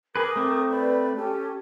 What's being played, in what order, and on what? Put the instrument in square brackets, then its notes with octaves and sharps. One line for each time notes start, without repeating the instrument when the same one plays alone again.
[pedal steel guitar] G#4 B4 [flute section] A#4 D6 D#6
[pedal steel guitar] A3 C4
[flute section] B4 D5 B5
C#4 G4 A4